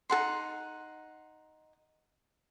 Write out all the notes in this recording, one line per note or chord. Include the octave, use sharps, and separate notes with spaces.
D#4 A4 F#5 C6